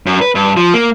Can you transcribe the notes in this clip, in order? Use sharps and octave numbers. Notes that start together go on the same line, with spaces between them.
F#2
B4
G2
F3
A#3